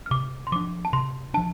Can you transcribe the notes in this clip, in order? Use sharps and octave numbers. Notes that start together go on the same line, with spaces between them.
F6
C3 D6
C6
F3 D4 D6
A5
C3 C6
F3 D4 A5